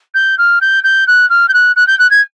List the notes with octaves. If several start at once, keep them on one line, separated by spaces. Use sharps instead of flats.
G6
F6
G6
G6
F#6
F6
G6
F#6
F#6
G6
F#6
G#6